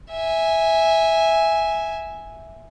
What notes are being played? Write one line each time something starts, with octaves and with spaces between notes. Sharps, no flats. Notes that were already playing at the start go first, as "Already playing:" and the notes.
E5 G#5